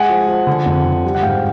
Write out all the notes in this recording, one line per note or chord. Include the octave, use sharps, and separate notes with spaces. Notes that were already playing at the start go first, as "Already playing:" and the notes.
Already playing: G#3 F#5 G#5
F3
F3
D3
F2
D3
G3
F#5
G#2 F5 G5